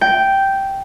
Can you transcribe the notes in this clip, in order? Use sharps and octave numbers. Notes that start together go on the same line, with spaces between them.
G5